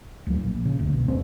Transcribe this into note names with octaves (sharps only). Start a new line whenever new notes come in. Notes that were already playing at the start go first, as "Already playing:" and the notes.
D2 F#3
A#1
C#3
F#1 D2
B1
F1 C#2 C4